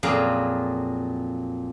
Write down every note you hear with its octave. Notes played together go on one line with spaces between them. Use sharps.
F2 A#2 F#3 G#4 F5